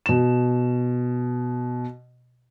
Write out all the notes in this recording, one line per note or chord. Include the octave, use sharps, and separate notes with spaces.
B2 E7